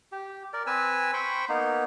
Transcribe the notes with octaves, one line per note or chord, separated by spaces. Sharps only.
G4
A#4 D5
C4 B4 G#5 E6
C5 G5 B5 C#6
A#3 B3 D#4